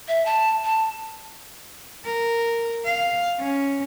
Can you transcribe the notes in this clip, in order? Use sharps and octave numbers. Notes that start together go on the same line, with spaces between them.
E5
A5
A5
A#4
F5
C#4